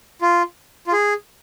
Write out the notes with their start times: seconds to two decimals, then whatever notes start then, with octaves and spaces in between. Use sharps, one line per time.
0.22 F4
0.87 F4
0.92 G#4